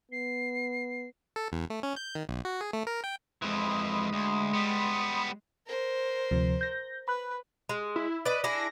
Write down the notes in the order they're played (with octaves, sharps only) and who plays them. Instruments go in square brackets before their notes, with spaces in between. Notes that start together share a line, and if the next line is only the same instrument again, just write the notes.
[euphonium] B3 [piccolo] C7
[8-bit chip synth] A4
E2
A3
C#4
G6
D#3
B1
F#4
G#4
A3
A#4
G5
[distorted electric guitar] F2 E3 [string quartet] G#3 [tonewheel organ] B5 C6 D#6
[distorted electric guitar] D2
G3 B3
[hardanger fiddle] A#4 C5
[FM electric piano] D2 C3 F3
G6 A#6
[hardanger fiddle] B4 [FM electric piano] B5 F#6
[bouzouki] G#3
[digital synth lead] E4
[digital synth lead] B4 [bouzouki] D5 D#5
[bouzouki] D4 E4 G#4 [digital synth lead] A#6